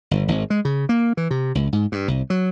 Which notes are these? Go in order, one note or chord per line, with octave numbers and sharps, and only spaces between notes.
G1
G#1
G#3
C#3
A#3
E3
C3
C#2
G#2
G2
C2
F#3